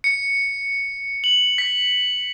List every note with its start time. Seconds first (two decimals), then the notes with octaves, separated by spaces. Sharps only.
0.04 C#7
1.24 F#7
1.58 B6